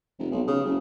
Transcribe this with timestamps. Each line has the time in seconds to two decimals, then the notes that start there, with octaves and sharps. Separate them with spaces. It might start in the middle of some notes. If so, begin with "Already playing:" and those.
0.19 F1
0.31 B1
0.47 C#3
0.65 F#1